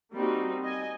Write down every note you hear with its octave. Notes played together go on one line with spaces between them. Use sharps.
G3 A#3 C4 D#4 F#4
D#5 G#5